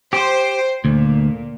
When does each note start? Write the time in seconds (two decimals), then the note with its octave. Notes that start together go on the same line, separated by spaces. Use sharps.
0.13 G4 C5
0.85 D2 A#2